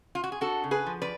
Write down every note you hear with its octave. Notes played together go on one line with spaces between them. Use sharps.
F4
F#4
G#4
D4 F#4 A4
C#3
G#4 B4
F3
B4 D5